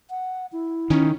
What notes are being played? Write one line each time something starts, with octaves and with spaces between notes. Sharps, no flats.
F#5
E4
D#3 C#4